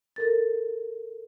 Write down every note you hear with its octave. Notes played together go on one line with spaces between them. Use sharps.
A4 A#4 A6